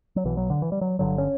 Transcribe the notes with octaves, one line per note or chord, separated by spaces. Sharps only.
F#3
B1 B2 E3
F#3
D3
E3
G3
F#3
G1 G2 D3 F#3
C#4